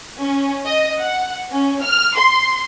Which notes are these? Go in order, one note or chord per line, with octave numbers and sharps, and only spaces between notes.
C#4
D#5
F#5
C#4
F6
C6